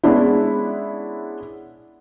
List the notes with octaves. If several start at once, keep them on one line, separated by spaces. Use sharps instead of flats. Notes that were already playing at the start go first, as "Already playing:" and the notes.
G#3 B3 C#4 D4 E4